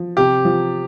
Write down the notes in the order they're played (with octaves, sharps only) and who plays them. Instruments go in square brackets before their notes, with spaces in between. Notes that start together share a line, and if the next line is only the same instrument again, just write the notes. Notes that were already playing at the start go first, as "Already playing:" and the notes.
Already playing: [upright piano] F3
[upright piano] C3 [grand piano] G4
[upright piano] F3